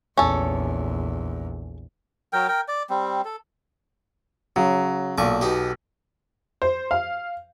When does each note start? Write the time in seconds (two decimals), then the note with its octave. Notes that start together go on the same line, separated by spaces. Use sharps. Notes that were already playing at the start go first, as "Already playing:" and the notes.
0.17 A#1 E2 C#4 A4
2.33 F#3 A#4 G5
2.48 A#4 G5
2.68 D5
2.90 G3 C4
3.25 A4
4.56 C#3 F#3
5.18 B1 A#2 C#6 D6
5.41 B2 D#4 G4
6.62 C5
6.91 F5